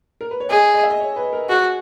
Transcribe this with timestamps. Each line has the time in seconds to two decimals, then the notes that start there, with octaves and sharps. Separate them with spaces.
0.21 A#4
0.31 B4
0.40 C#5
0.50 G#4 D#5
0.74 D#5
0.83 E5
0.90 D#5
1.00 C#5
1.16 B4
1.33 A#4
1.49 F#4 G#4